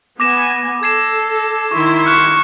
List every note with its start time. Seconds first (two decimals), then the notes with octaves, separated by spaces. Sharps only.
0.20 B3 G#5 D6 A#6 E7
0.83 A4 G#6 C7 E7
1.71 D#3 E4 C6 C#6
2.06 C#6 F6 F#6 E7